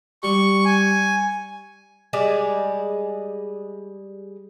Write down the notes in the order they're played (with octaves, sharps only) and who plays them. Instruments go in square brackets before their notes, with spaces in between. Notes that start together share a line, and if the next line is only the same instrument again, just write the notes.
[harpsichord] G3 [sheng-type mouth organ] C#6
[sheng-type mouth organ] G#5
[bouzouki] G3 G#3 G#4 D5